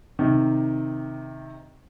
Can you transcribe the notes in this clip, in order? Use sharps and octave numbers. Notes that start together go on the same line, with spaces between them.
C3 D#3